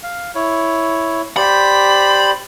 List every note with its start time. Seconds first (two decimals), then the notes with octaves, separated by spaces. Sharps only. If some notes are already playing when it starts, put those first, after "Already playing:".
0.03 F5
0.35 E4 C#5
1.37 G4 C5 D5 B5